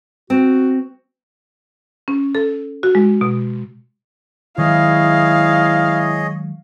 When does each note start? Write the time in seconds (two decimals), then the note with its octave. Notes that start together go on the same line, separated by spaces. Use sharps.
0.30 C4 F#4
2.08 C#4
2.35 A4
2.83 F#4
2.95 G#3
3.21 B2
4.58 D#3 F#3 G#3 E4 G#4 C#5 D#5 F5